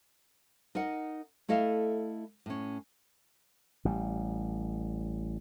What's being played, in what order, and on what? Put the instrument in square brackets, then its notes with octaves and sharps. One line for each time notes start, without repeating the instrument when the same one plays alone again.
[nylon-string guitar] D#4 A#4 D#5 F#5
A3 E4 A4 D#5 F5
A2 C#4
[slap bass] A1 G3